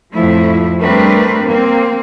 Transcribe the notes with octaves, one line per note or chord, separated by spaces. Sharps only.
F2 A2 F3 A3 E4
G3 A3 C4 D4 A#4 B4
A#3 C4